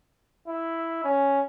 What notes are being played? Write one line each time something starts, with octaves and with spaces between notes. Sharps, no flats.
E4
C#4